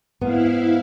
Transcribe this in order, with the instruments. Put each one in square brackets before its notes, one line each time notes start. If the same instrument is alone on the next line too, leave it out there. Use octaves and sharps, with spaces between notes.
[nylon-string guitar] G#2 B3 [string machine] E4 F5